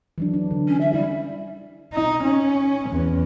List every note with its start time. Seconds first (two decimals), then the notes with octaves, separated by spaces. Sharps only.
0.18 E3 F#3 D4
0.34 D4
0.51 D3
0.68 C#4
0.81 E5
0.93 G3 E4
1.93 D#4
2.24 C#4
2.90 E2